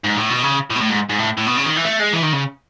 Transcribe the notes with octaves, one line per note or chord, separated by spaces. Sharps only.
G#2
A2
B2
C#3
A2
B2
A2
G#2
G#2
A2
A2
B2
C#3
D#3
E3
A3
G#3
E3
D#3
C#3